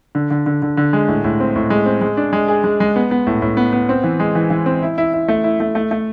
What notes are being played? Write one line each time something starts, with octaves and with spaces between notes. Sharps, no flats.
D3
D3
D3
D3
D3
G#3
A2
A2
C4
A2
G#3
C4
G#3
D4
G#3
G#4
G#3
G#3
B3
B3
A2
A2
B3
B3
C4
E3
G#3
E3
E3
C4
E4
E4
E4
A3
E4
A3
A3
A3